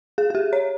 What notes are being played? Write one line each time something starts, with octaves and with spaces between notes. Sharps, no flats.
G#4
G#4
G4
C#5